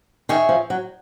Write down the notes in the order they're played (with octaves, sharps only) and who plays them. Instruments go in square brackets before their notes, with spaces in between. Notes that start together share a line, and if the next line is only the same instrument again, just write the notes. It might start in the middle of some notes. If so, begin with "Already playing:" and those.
[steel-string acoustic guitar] D#3 [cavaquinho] G#4 C#5 E5
[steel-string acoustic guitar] F3
F#3